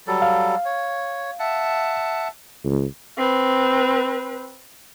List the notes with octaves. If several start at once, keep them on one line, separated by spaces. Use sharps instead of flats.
F#3 G3 A4
F5
C#5
E5 F#5 A5
C#2
C4 B4